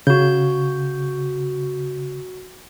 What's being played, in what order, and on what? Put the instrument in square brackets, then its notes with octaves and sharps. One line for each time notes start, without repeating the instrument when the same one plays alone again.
[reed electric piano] C#3 [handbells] F#4 G6